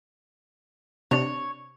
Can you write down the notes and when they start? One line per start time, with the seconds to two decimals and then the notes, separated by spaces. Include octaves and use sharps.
1.11 C3 D4 C#5